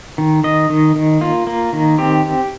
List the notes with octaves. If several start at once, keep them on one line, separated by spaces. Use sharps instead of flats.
D#3
D#3 D#5
D#3
D#3
A#3 F4
A#3
D#3
C4 G4